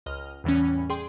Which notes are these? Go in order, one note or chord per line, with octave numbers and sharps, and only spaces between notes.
C#2 D#5 F6
E2 A2 E3 G3 C#4
G#4 D5 G5 C6